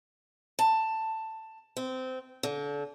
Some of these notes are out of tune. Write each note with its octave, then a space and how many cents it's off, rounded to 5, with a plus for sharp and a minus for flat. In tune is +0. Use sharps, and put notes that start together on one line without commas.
A5 +10
C4 -20
D3 -30